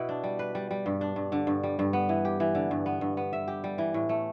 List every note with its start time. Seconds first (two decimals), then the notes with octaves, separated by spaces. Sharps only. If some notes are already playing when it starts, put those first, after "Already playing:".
Already playing: B2 E4
0.09 D4
0.24 G3
0.39 B4
0.55 G3
0.71 G3
0.86 G2
1.01 D4
1.16 G2
1.32 D3
1.47 G2
1.63 G3
1.79 G2
1.93 B3
2.09 E3
2.25 G4
2.40 E3
2.55 D3
2.71 G2
2.86 B3
3.01 G2
3.17 B3
3.33 E5
3.48 G4
3.64 G3
3.78 E3
3.94 A2
4.09 A3